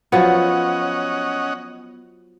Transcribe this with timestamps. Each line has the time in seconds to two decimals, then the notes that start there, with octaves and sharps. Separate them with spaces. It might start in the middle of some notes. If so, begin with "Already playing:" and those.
0.12 F3 F#3 B3 C#4 D#5 F#5